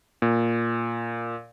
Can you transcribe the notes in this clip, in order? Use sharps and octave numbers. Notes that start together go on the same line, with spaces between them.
A#2